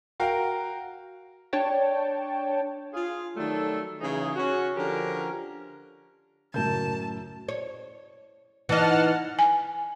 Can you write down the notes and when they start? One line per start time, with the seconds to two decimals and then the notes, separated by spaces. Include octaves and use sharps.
0.20 F#4 A#4 F5 G5
1.53 D4 C#5 G5 A5
2.94 F4 G#4
3.37 D#3 F#3 G3 A3 A4
4.01 C#3 E3 F#3 D#4 G#4
4.36 C#4 F#4
4.77 D3 F3 C#4 G4 A#4
6.54 F#2 A2 C#3 A#4 A5 G6
7.48 C#5
8.69 E3 D#4 F#5 A5 F6
9.39 G#5